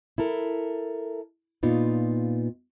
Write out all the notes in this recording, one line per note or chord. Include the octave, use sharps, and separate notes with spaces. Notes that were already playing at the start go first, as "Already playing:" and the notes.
E4 A4 A#4
A#2 B3 D#4 F4